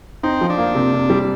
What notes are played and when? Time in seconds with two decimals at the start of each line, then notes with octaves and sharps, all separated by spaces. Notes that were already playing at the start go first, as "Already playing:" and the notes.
0.23 C4 D#4
0.41 F3
0.50 D4
0.58 A#3
0.75 C3
0.93 C3
1.10 G3